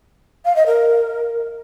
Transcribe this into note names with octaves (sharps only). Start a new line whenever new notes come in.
F5
D#5
A#4